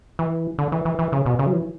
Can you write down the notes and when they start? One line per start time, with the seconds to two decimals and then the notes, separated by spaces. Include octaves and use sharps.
0.19 E3
0.58 D3
0.72 E3
0.85 E3
0.99 E3
1.12 C#3
1.26 B2
1.39 C#3
1.46 F#3
1.53 E3